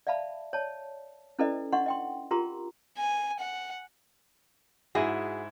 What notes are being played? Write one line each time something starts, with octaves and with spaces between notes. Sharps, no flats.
D5 E5 F5 A5 B5
C#5 D5 A5
C#4 E4 A4 B4 D5 D#5
D4 D#4 D#5 F#5 C6 C#6
D#5 G5 C6
F4 G4 A#4 A#5 C6
G#5
F#5
G#2 E4 F#4 G#4